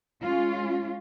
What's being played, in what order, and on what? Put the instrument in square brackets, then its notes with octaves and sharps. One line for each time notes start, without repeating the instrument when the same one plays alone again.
[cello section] G#3 C#4 F4